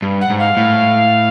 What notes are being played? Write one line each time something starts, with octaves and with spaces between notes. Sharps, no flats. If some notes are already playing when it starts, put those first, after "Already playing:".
G2
F#5
G#2
F5
A2